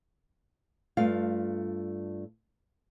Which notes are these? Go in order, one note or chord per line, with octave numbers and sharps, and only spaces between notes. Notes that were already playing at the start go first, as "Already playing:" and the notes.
G2 A3 F4 F5